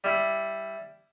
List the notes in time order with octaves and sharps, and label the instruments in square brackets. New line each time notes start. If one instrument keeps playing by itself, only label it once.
[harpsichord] G3 E4